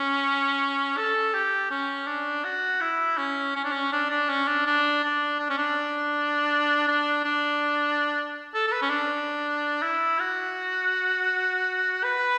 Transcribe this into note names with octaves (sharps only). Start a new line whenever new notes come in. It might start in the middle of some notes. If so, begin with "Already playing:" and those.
Already playing: C#4
A4
G4
C#4
D4
F#4
E4
C#4
C#4
D4
C#4
D4
D4
C#4
D4
D4
D4
D4
C#4
D4
D4
D4
A4
A4
B4
C#4
D4
E4
F#4
B4